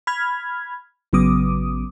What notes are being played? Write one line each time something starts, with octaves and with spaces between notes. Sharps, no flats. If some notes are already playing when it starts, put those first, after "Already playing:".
B5 F6 G#6
A1 C#3 F#3 B3 D6 D#6